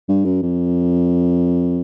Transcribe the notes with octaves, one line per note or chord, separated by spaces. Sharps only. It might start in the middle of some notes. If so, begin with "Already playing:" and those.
G2
F#2
F2